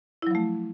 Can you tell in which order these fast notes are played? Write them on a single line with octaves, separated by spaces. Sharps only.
E4 F#3 F3 A3